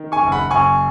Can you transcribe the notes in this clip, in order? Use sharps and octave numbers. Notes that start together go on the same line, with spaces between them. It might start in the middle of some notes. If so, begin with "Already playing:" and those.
Already playing: D#3
G#5 C#6
F#1
F#5 B5
F#1 G#5 C#6